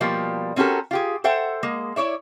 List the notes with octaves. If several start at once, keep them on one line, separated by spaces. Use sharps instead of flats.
B2 F3 G3 A#3
C4 C#4 F#4 G4 A4 A#4
F4 G4 G#4
A4 C5 E5 F#5 G5
G#3 A#3
E4 C#5 D5 E5